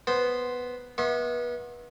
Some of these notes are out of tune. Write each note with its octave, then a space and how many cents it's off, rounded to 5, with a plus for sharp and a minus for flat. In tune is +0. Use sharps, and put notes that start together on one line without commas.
B3 +0 C5 -5
B3 -30 E5 -30 C6 +40